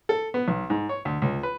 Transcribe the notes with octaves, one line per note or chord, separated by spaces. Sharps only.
A4
B3
B1
G#2
C#5
D2
C#2
B4